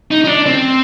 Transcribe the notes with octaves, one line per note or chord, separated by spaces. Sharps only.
D#4
D#4
D4
C4